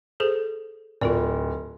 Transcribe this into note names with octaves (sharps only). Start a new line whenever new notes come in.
G#4 A4 C5
D1 F4 A#4 D5